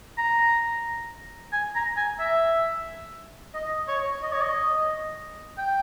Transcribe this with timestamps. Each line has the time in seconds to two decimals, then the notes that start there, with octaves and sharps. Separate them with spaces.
0.18 A#5
1.52 G#5
1.75 A#5
1.97 G#5
2.19 E5
3.55 D#5
3.88 C#5
4.23 D#5
4.33 C#5
4.42 D#5
5.58 G5